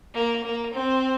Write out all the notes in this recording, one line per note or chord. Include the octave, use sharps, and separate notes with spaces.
A#3
A#3
C4